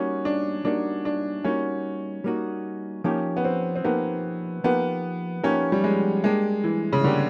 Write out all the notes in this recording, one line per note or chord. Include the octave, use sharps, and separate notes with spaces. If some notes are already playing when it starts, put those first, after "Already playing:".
Already playing: G3 A#3 C#4 D#4 F#4
D4
G3 A#3 D4 D#4 F#4
D4
G3 A#3 C#4 D#4 F#4
G3 A#3 D#4 F#4
F3 A#3 C#4 D#4 G4 A#4
B3
C4
C4
F3 A#3 B3 D#4 G4 A#4
F3 A#3 B3 D#4 G4 A#4
F3 A#3 C#4 D#4 G4 A#4
G3
G#3
G3 G#3 A#3 D4 G4
E3
C#3
D3 G3 A#3 D4 G4